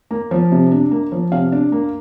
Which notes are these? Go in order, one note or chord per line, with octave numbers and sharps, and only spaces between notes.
A#3
F3
C3
D4
A#3
F3
C3 F5
D4
A#3